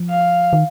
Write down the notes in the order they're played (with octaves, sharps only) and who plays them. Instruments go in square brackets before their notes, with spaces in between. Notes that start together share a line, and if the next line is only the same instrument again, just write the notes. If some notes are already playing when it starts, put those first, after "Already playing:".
Already playing: [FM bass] F3
[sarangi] F5
[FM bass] D#3